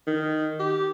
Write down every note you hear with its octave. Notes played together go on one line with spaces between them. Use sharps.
D#3
G4